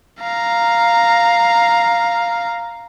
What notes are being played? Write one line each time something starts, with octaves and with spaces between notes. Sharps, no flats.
F5 A#5